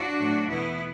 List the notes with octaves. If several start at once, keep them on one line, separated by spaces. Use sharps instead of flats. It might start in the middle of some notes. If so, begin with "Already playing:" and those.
Already playing: D4 F#4
A2 F#3 A3
E2 B2 A3 B3 E4